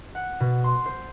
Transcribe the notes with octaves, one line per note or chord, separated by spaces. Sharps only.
F#5
B2
C6
C5